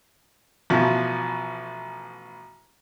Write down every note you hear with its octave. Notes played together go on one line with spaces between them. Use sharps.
A1 B2 F3